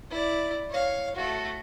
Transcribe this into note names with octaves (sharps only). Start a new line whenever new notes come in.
E4 D5
C#5 F5
A3 F#4